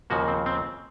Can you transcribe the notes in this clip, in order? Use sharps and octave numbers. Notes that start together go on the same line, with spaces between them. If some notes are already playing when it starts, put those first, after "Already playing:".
D#2 C#3 F3 A#3 F#4
C4
C4